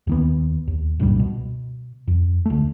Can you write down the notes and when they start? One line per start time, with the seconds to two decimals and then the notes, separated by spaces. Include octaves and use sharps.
0.07 D#2 D#3 B3
0.68 D#2
1.00 C#2 G2 A#2 G3
1.20 B2
2.07 F2
2.46 D2 A3